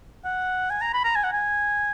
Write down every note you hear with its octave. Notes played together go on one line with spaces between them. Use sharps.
F#5
G#5
A#5
B5
A#5
G#5
F#5
G#5